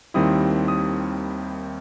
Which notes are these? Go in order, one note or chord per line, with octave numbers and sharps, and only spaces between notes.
D#2 D#3 G3 C4 E4 D#6
D#6